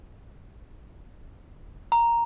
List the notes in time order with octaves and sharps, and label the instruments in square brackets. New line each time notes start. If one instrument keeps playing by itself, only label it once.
[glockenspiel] A#5